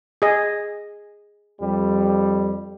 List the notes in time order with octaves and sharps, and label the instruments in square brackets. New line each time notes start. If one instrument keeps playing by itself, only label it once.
[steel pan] G#4 D#5
[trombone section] F2 G3